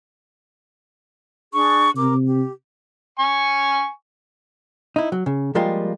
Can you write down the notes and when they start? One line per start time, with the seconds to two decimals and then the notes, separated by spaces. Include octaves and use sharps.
1.53 D4 G#4 C#6
1.95 C3 A#4 D6
2.25 G4
3.19 G#5 C#6
4.96 D#4 E4
5.12 F#3
5.26 C#3
5.55 F3 G3 G#3 A#3 F4 A#4